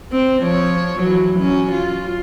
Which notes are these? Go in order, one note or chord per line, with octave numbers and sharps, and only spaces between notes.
C4
F3 C#5
E3 F#3
F#3 C#4
F4